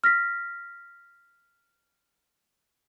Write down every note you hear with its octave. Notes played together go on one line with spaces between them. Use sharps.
F6 A#6 B6